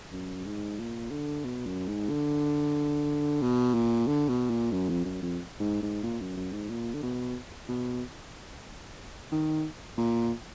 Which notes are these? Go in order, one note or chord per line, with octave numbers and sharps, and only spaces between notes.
F#2
G#2
A#2
D3
B2
F#2
G#2
D3
B2
A#2
D3
B2
A#2
F#2
F2
F#2
F2
G#2
G#2
A#2
F#2
F#2
G#2
A#2
D3
B2
B2
D#3
A#2